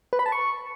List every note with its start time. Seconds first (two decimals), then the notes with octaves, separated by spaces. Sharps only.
0.13 B4
0.19 B5
0.26 A5
0.32 C#6